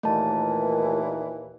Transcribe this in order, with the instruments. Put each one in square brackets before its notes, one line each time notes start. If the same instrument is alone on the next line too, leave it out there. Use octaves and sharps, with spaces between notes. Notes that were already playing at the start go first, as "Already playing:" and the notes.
[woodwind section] D#2 A#2 E3 [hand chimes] A3 A5